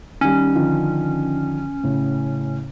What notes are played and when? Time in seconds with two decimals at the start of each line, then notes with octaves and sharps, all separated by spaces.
0.21 D#3 G3 C#4
0.55 D3 D#3 F3
1.84 A2 C#3